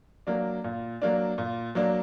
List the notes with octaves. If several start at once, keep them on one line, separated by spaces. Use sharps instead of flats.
F#3 A#3 D4
A#2
F#3 A#3 D4
A#2
F#3 A#3 D4